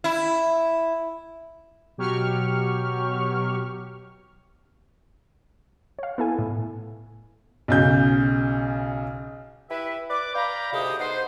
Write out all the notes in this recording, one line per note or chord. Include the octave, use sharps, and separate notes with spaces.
E4
B2 F#3 G4 C#6 F6
C#5 F5
B3 E4 A4 G#5
A2
B1 C#3 G6
E4 G4 B4 E5
B4 D5 D6
D5 F5 G5 A#5 B5
D2 G#2 C3 G4 D#6
B3 D#4 C5